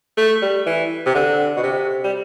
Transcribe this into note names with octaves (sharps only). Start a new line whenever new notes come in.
A3
G3
E3
C3
D3
B2
C3
G3